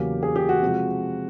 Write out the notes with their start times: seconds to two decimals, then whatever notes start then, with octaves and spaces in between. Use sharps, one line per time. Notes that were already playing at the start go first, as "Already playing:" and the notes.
Already playing: E2 C#3 F#3 A#3 C#4 G4
0.23 G#4
0.36 G4
0.49 F#4
0.62 C3 F3 G#3